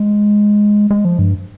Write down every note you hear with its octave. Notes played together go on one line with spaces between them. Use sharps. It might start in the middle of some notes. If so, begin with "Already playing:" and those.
Already playing: G#3
G#3
F3
G2